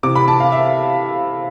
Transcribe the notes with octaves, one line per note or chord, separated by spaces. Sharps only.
C3 E3 D6
B5
A5
F5
E5